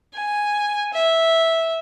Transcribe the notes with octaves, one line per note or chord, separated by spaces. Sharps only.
G#5
E5